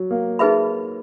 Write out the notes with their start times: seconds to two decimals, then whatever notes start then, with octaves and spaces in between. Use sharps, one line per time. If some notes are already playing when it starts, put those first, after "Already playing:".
Already playing: F#3
0.11 A#3
0.39 D#4 G#4 B4 E5 B5